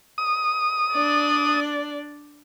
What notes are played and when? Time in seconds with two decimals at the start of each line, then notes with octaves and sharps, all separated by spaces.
0.18 D#6
0.93 D4 D5